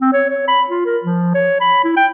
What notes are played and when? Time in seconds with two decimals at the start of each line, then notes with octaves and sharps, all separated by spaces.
0.01 C4
0.13 C#5
0.30 C#5
0.48 B5
0.70 F4
0.86 A#4
1.04 F3
1.35 C#5
1.61 B5
1.84 E4
1.97 G5